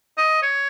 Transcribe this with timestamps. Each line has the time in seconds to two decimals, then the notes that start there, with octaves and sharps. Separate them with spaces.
0.18 D#5
0.42 C#5